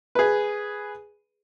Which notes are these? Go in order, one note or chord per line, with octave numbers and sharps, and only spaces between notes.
G#4 B4